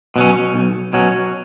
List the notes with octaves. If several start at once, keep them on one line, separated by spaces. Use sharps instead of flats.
B2 F#3 C#4
B1
B2 F#3 C#4